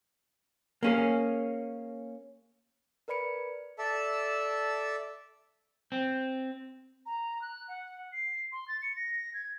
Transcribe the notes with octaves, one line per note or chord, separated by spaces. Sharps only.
A#3 C#4 G#4
A#4 B4 D5 B5 C#7 D7
A4 D5 E5 A5 E6
C4
A#5
F#6
F#5
C7
C6
A6
C#7
A#6
G#6